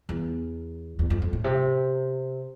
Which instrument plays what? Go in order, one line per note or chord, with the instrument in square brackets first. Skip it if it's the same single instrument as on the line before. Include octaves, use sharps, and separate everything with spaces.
[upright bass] E2
E2
F2
F2
A2
C3